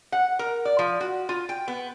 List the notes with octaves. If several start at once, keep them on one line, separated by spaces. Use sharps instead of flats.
F#5
A#4
D5
F3
F#4
F4
G5
B3